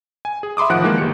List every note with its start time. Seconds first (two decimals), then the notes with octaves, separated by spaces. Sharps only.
0.25 G#5
0.43 G#4
0.57 E5 B5 C6 D6 D#6
0.69 A1 D#3 F3 F#5 F#6 D7
0.83 D#3 E3 G#3 A#3
0.98 G1 G4 C#7